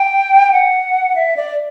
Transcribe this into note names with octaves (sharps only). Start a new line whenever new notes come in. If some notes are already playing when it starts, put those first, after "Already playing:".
Already playing: G5
F#5
E5
D5